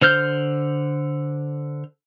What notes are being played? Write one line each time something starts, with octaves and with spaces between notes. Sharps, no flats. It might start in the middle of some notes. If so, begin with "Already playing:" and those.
D3 C5 F6 G6